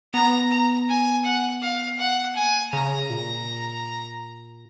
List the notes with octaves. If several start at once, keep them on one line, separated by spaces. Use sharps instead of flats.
B3 A#5
A#5
G#5
F#5
F5
F#5
A#3 G#5
C#3 A#5
A#2